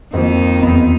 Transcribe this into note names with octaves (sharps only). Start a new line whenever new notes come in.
F2 D#3 F3 A#3 D#4
E2 B3